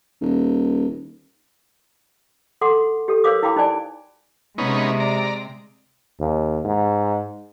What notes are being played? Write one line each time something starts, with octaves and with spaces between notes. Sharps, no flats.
D#1
A4 F#5 C6 D6
G4 A4
A#4 C5 C#5 F5 D6 D#6
E4 F5 G5 B5 D6
D#4 C5 D5 G#5
C3 G#3 B3 C#4 D#4
D5 A#5
D#2
G#2